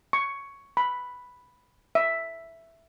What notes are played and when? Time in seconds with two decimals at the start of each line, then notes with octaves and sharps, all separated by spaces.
0.13 C#6
0.77 B5
1.95 E5